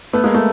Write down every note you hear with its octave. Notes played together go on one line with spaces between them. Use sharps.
A3 B3
G#3 A#3
A3